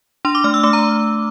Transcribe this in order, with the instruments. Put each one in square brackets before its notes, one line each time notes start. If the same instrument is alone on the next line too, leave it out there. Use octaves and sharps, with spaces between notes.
[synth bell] D4 C6
D6
A3 F6
E6
A3 D6
A#5